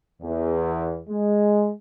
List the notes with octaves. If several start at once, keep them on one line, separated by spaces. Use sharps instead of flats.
E2
G#3